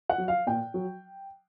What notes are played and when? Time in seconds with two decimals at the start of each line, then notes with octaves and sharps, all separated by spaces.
0.09 F#5
0.18 F#3
0.28 F5
0.47 A#2 G5
0.74 F#3